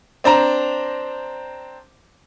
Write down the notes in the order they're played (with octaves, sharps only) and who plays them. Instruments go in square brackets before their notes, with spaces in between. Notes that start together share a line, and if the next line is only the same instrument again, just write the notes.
[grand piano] C4 D4 C5 A#5